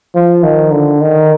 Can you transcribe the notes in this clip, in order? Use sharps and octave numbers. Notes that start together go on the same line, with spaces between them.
F3
D#3
D3
D#3